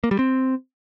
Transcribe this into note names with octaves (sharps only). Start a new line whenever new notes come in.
A#3
G3
C4